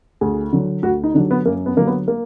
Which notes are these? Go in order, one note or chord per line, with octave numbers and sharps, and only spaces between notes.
D2 G#4
D3 F#3
D2 F#4
D#4
D3 F#3 D4
B3
F#2 A#3
B3
D3 F#3 A#3
B3
A#3